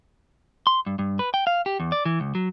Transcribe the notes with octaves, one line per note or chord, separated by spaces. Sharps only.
C6
G2
G2
B4
G5
F5
G4
E2
D5
E3
C#2
F#3